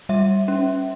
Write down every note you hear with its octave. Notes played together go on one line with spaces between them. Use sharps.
G3 E5
C#4